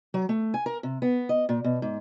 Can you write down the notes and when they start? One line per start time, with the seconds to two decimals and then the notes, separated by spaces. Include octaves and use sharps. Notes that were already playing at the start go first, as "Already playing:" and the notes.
0.14 F#3
0.29 A3
0.54 G#5
0.66 A#4
0.83 C3
1.02 B3
1.29 D#5
1.49 A#2
1.64 B2
1.82 G#2